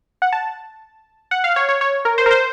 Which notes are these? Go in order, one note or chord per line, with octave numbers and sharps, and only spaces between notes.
F#5
A5
F#5
F5
C#5
C#5
C#5
A#4
C5
A#4
C5